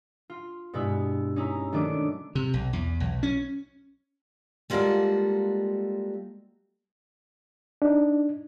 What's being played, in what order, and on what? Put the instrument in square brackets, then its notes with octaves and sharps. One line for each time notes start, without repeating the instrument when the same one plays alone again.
[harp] F4
G2 B2 G#3 B3 E4
C#4 D#4 E4 A#5
D#3 F#3 A3 D4 D6
[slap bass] C3
B1
E2
B1
C#4
[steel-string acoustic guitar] G3 G#3 A#3 F4 F#4 A4
[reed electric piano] D4 D#4